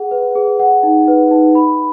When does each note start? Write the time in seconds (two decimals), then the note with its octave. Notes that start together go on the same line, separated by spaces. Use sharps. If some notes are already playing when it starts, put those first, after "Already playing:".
Already playing: G#4 F#5
0.11 B4
0.36 G#4
0.59 F#5
0.83 D#4
1.08 B4
1.31 D#4
1.55 B5